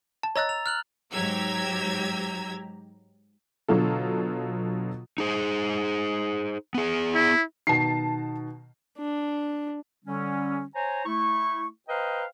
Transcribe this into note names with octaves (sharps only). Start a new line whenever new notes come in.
A5
C#5 D#5 A#5 E6 F#6 A6
F7
F6 F#6 F#7
G#2 F#3 G4 A#5 E6 G#6
B2 D3 F#3 F4 A4
D#4 G#4 C5
B3 G#4
E4
B2 D#3 A5 C7
D4
D3 G3 C#4
C5 C#5 G#5 A#5
A3 E4 C#6
B4 C5 D#5 F5 G5 A#5